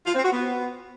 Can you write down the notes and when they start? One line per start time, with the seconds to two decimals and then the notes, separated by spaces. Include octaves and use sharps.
0.06 F4
0.15 C4
0.24 F#4
0.32 B3